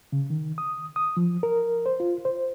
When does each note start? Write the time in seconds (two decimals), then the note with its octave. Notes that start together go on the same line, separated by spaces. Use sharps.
0.12 C#3
0.30 D#3
0.58 D#6
0.96 D#6
1.17 F3
1.43 A#4
1.86 C5
2.00 F4
2.25 C5